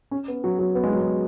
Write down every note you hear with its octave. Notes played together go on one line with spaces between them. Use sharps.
C#4
B3
F#3
F#3
B3
G#3
F#3
G#3